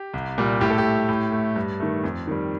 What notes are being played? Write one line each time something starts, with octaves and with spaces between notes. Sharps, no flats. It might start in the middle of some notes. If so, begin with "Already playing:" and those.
Already playing: G4
C2
A#2 G3
A2 G4
A4
G4
A3
A2
A3
G2
D#3 A3
F2
D#3 G3